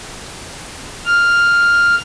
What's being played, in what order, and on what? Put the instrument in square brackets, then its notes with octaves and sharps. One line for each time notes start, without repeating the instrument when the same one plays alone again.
[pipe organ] F6